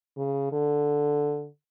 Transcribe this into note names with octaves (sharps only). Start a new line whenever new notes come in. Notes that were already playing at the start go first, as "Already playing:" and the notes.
C#3
D3